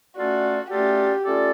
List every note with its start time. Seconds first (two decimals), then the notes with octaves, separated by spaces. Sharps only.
0.17 A3 C#4 F4 F#4 A4 D5
0.70 A3 C#4 F4 G4 A4 D5
1.24 A3 C#4 F4 A4 D5